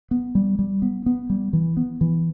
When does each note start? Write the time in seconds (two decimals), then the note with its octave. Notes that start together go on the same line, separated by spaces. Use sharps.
0.11 B3
0.35 G3
0.59 G3
0.82 B3
1.06 B3
1.30 G3
1.53 E3
1.77 B3
2.01 E3